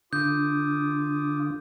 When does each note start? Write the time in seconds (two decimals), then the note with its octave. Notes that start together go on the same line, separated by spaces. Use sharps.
0.13 D3 F4 D6 D#6 G6